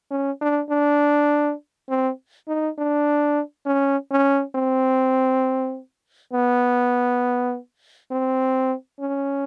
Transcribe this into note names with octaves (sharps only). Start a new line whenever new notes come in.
C#4
D4
D4
C4
D#4
D4
C#4
C#4
C4
B3
C4
C#4